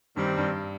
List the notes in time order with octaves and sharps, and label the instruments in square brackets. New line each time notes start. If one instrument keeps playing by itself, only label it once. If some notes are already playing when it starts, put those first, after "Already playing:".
[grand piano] G2 [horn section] D#3 G3 C4
[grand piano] G2